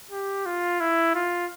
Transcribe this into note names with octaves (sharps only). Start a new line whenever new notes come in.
G4
F4
E4
F4